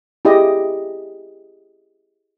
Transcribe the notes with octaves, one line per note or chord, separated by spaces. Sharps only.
E4 G4 G#4 D#5